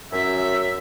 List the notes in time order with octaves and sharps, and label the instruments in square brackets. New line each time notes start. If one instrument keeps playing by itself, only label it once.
[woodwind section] F#2 [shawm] E5